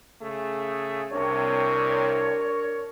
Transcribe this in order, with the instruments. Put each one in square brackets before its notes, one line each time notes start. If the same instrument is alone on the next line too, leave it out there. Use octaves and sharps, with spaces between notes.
[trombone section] C#3 A3 G#4
[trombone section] C2 C3 [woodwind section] D4 A#4 C#5